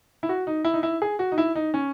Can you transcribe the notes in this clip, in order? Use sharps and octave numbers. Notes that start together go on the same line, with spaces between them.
E4
F#4
D#4
E4
D#4
E4
G#4
F#4
D#4
E4
D#4
C#4